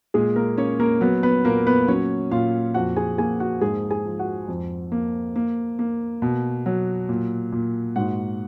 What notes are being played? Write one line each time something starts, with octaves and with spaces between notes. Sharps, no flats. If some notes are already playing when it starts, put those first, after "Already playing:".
A#2 G#3 G#4
A#3 A#4
A#3 C#4 C#5
A#3 A#4
F#3 B3 B4
B3 B4
A#2 A#3 A#4
B3 B4
F#3 C#4 C#5
A#2 F4 F5
F2 F#4 F#5
G#4 G#5
A#3 G#4 G#5
F#4 F#5
G#2 G#4 G#5
G#4 G#5
F3
F#4 F#5
F2
A#3
A#3
A#3
B2
F#3
A#2
A#2
G#2 F#4 F#5